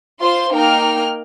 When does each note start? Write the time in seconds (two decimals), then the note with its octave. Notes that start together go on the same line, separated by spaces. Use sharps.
0.21 F4 C5 C6
0.53 A#3 D#4 A#4 G5 F6